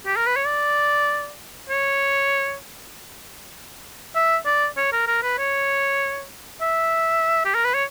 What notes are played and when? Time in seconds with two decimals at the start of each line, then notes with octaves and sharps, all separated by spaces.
0.06 G4
0.16 A#4
0.27 B4
0.36 C#5
0.46 D5
1.70 C#5
4.15 E5
4.46 D5
4.77 C#5
4.93 A#4
5.08 A#4
5.23 B4
5.38 C#5
6.62 E5
7.45 G4
7.55 A#4
7.65 B4
7.75 C#5